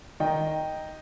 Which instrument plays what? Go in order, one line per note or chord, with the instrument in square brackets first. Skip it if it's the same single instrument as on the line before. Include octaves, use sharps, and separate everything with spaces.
[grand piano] D#3 D#5 G5